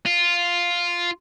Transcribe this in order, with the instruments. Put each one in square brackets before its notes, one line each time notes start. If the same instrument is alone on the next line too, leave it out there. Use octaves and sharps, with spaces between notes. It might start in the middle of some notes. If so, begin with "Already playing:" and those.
[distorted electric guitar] F4